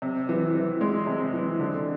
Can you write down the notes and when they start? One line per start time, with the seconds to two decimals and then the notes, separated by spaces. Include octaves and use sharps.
0.02 C3
0.29 E3
0.55 E3
0.81 G#3
1.07 C3
1.34 E3
1.59 D3